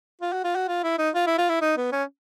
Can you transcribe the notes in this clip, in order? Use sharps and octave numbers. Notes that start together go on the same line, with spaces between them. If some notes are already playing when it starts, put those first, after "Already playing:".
F4
F#4
F4
F#4
F4
E4
D#4
F4
E4
F4
E4
D#4
B3
C#4